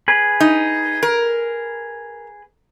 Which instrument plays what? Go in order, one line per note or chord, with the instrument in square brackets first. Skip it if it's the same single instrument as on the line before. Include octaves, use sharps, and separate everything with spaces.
[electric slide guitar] G#4 B4
[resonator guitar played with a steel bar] D#4
A#4